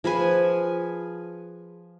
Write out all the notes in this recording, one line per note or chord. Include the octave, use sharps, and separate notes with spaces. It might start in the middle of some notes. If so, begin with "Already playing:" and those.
F3 G#4 B4 G#5